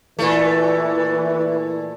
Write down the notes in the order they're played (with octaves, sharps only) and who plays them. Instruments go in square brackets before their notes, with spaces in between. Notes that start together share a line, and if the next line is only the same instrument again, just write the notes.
[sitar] A#2 A3 [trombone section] E3